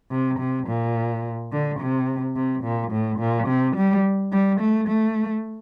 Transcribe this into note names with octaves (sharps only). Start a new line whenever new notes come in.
C3
C3
A#2
D3
C3
C3
A#2
A2
A#2
C3
G3
G3
A3
A3